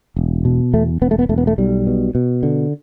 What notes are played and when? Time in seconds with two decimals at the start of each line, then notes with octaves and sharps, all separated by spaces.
0.16 E1
0.45 B2
0.74 E2 A3
1.02 E1 B3
1.11 A3
1.19 B3
1.29 E1 A3
1.38 B3
1.47 A3
1.58 B1 G3
1.87 B2
2.15 B2
2.43 D3